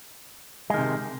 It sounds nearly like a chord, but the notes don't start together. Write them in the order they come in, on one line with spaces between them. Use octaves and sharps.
G#3 D#3 C3